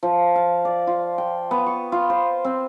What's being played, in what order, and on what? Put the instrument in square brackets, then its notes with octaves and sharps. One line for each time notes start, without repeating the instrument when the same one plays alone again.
[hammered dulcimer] F3
F5
D5
F4
G5
B3
C#6
F4
C5
C4